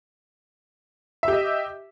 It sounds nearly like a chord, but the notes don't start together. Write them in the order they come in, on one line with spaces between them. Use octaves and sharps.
E5 G4 D#5